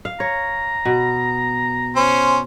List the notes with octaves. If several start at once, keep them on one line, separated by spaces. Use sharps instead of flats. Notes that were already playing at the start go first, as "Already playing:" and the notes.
F5
C#5 A#5
B2
C#4 C5